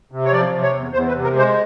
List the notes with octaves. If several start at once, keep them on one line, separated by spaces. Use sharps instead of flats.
C3
C#5
F3 D5
C3
C#5
E2
E2 C5
B4
C3
A#4
G#3 C5